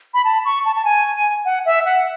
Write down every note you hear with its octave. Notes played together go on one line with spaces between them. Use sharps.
B5
A5
C#6
A5
A5
G#5
F#5
E5
F#5